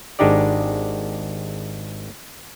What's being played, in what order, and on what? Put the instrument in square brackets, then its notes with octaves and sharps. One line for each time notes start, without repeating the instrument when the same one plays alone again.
[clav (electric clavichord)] G#1 G#3 D4 D#4 G4 D5